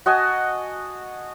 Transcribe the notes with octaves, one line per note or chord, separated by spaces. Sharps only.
F#4 D#5 G#5 A5